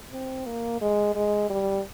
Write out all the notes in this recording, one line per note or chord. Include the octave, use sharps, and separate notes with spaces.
C4
A#3
G#3
G#3
G3